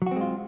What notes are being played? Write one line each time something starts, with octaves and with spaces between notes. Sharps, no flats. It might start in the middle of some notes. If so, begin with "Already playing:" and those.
F#3 G#3 C4 F4 F#4